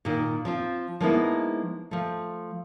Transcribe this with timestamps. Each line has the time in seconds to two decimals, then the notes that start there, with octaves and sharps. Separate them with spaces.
0.05 A#2 D#3
0.45 F3 C4 F4
1.00 F3 G#3 A#3 B3 D#4 E4
1.91 F3 A3